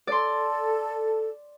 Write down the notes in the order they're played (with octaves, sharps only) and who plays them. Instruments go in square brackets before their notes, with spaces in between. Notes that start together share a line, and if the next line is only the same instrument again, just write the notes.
[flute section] A4 [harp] D5 C6